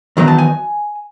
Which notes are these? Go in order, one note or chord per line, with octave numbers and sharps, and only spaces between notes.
E2 D#3 F#3 B3 D#4
A5
G#5